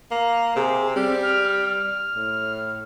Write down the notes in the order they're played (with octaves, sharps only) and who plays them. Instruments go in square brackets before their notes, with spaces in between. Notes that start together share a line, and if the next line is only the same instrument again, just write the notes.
[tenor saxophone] A#3
[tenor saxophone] C3 [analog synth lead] G#4
[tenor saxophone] G3 [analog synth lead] C4
[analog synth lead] F6
[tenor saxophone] A2